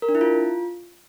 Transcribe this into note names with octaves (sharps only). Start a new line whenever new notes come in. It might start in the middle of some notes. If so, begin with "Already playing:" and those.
A#4
D4
E4
F4